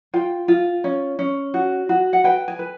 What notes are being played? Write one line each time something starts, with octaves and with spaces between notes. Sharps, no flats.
F4 G5
F4
C#4
C#4
F#4
F#4
F#5
B4 G5
G#5
B4